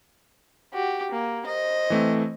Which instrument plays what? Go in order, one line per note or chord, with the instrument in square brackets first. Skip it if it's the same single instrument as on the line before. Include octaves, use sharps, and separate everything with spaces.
[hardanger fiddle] F#4 G4
A#3
C5 D#5
[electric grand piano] E3 A3 C4